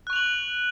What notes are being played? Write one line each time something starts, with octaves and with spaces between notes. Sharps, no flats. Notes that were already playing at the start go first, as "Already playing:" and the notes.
C#6 F#6 F7 F#7